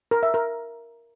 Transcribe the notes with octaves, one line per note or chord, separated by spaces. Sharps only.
A#4
E5
A#4